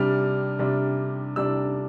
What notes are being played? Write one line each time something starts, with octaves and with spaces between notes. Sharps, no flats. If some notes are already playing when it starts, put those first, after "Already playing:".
Already playing: C3 G3 D4 F6
C3 G3 D4
C3 G3 D4 E6